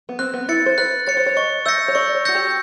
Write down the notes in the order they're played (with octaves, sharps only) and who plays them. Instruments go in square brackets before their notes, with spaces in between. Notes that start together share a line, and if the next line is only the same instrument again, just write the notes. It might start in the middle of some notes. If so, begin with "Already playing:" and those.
[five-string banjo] B3
[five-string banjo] C4 [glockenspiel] F#6
[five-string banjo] B3
[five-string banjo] E4 [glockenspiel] A6 C#7
[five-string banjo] C5
[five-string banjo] B4 [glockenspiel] F#6
[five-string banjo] C#5 [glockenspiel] A6 C#7
[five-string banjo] C5
C#5
[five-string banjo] D#5 [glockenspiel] C#6
[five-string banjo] E5 [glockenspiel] E6 G6 A#6 C#7
[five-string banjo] C#5
[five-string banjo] D5 [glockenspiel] C#6
[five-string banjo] C#5
[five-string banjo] F#4 [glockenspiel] E6 G6 A#6 C#7
[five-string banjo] G4